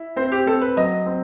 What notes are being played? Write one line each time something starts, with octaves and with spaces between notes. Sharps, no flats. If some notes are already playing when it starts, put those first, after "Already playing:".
Already playing: E4
C4 C5
G4
C4 A4
B4
F#3 D#5
C4